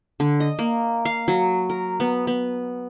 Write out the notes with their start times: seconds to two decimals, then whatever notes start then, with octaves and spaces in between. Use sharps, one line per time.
0.20 D3
0.40 D#5
0.59 A#3
1.05 F5
1.28 F#3
1.70 A#4
2.00 B3
2.27 B3